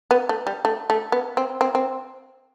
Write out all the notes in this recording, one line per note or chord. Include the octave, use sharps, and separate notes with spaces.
B3
A3
G3
A3
A3
B3
C4
C4
C4